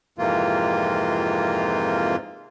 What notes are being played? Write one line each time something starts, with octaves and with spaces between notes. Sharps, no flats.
F2 G#2 C3 E3 A#3 F4